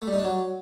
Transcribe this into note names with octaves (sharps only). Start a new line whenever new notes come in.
A3
G3
D#4
D4
F#3